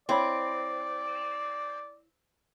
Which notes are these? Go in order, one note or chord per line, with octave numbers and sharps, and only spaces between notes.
C4 E4 C#5 D5 B5